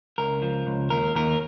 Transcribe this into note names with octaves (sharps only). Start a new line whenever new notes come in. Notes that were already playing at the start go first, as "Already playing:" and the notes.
C#2 A#4
F3
C#2
D#2 A#4
D#2 A#4